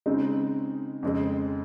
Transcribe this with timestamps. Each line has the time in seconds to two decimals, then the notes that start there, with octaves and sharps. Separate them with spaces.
0.06 C#3 G#3 C4 D#4
1.03 F2 C#3 G#3 C4